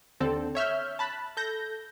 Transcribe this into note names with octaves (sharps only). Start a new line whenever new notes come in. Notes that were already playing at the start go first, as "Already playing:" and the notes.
D#2 D3 C4 A4
C#5 E5 F6 G6
A5 B5 F#6
A4 G6 A#6